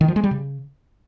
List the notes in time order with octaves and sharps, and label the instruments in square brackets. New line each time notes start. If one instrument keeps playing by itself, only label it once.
[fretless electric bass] D#3
F3
G#3
G3
C#3